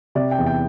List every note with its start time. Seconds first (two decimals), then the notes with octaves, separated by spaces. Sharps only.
0.15 C3 D5
0.31 G5
0.38 E2
0.47 G5